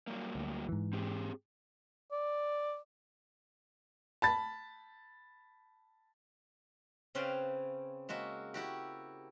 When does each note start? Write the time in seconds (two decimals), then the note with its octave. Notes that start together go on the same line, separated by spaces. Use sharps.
0.07 F#3 G3 A#3
0.35 D2
0.69 G#2 E3
0.93 C4 G4 G#4
2.12 D5
4.22 A5 B5 A6
7.15 C#3 C4 C#4 B4 F5 G5
8.09 G#3 A#3 F#4 E5
8.54 E4 F#4 G4